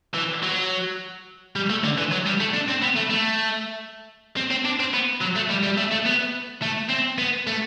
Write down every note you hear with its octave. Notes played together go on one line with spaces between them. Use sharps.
E3
F#3
G3
A3
D3
E3
F#3
G3
A3
D4
C4
B3
A3
A3
C4
C4
D4
C4
B3
F#3
A3
G3
G3
A3
A3
B3
A3
C4
B3
A3